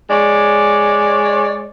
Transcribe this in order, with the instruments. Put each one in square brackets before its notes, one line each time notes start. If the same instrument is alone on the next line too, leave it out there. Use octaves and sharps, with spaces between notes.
[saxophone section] G#3 C#5 D5